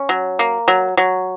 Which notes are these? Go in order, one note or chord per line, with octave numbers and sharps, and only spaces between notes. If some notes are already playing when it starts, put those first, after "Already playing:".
Already playing: C#4
F#3
A#3
F#3
F#3